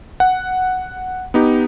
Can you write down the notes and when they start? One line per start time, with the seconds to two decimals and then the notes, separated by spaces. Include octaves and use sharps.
0.20 F#5
1.34 B3 D#4 G4